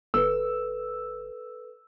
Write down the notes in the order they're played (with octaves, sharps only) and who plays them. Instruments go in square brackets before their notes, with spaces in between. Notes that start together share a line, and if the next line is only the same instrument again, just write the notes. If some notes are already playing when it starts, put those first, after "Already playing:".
[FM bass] G1 [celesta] A4 B4 [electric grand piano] E6